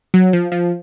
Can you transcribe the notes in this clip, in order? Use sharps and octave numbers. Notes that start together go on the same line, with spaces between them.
F#3
F3
F3